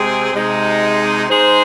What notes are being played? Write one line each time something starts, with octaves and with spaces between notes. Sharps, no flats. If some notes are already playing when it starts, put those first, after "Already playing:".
Already playing: C3 G#3 C4 G#4
C3 G#3 D#4
G#3 D#4 G#4 C5